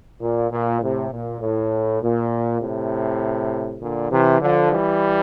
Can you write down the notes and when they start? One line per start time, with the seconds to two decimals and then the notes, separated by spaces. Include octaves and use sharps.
0.21 A#2
0.51 A#2
0.81 A2 C3
1.11 A#2
1.41 A2
2.01 A#2
2.61 A2 C3
3.81 A#2 D3
4.11 C3 E3
4.40 D3 F3
4.71 E3 G3